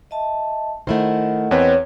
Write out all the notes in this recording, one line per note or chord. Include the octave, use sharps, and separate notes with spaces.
D#5 E5 A5
D#3 A3 E4 A#4 C5 D#5 F#5
E2 C4 B4 C#5